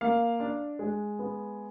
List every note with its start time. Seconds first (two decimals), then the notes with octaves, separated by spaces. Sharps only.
0.01 A#3 F5
0.40 D4
0.79 G#3
1.19 B3